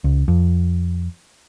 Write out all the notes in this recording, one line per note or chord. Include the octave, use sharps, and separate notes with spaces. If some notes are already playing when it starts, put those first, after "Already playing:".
C#2
F2